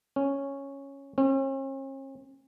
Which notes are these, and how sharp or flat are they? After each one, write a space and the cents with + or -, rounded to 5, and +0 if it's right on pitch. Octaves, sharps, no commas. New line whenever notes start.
C#4 -5
C#4 -45